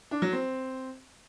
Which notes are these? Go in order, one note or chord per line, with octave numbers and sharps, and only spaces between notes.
D4
F#3
C4